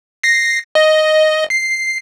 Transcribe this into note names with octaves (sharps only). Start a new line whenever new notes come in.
A#6 C7
D#5
C7